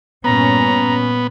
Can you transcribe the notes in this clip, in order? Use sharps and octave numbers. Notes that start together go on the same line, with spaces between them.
G2 A#2 B3 C#4 A#5